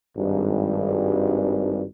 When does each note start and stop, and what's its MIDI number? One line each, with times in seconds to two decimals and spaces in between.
0.16 1.84 32
0.16 1.84 43